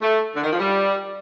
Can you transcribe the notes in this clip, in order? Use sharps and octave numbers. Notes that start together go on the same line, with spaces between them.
A3
D3
D#3
F3
G3